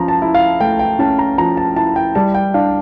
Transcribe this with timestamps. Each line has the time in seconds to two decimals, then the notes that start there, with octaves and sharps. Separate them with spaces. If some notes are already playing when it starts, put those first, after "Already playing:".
Already playing: F3 C#4 A#5
0.08 A5
0.22 E4
0.34 F5
0.60 A3 G5
0.79 G5
0.99 C#4 A5
1.19 A#5
1.38 F3 A#5
1.57 A5
1.76 E4 A5
1.96 G5
2.15 G3 A5
2.35 G5
2.54 D4 F5